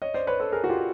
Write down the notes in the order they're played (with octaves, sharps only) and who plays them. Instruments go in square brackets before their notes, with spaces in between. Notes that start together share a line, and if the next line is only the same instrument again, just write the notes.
[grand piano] C#5 D#5
C5 D5
B4 C#5
A4 B4
G#4 A#4
F#4
F4 G4